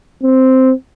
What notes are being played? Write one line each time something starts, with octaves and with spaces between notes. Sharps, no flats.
C4